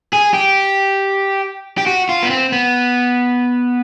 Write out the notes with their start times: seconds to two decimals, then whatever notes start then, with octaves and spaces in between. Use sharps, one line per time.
0.13 G#4
0.34 G4
1.78 G4
1.86 F#4
2.09 F4
2.23 B3
2.30 C4
2.52 B3